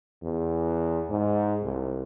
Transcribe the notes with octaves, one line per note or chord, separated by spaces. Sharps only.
E2
G#2
C2